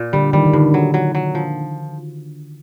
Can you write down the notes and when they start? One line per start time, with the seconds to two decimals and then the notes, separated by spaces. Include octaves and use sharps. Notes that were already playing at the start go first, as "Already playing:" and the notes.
Already playing: A#2
0.13 D3 G3
0.33 D#3 G3
0.45 D#3
0.53 G2 D3
0.74 F#3
0.94 F#3
1.15 F#3
1.35 F3